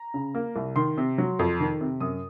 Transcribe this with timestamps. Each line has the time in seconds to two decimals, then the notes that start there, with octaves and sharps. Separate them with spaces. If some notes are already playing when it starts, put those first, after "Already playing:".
Already playing: A#5
0.14 C#3
0.35 A#3
0.56 C2
0.76 D#3 C6
0.98 C3
1.18 F#3
1.39 F2
1.60 D#3
1.81 C3
2.00 F#2 D#6